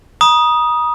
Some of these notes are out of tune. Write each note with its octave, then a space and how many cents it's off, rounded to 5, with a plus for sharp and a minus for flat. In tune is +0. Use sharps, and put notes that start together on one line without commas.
A#5 +45 D#6 +0